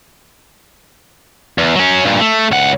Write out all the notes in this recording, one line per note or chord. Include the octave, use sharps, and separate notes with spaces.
E2
F#3 C#4
G2 A#2
A3
C#2 F#5